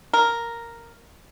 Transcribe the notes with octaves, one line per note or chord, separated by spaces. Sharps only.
A#4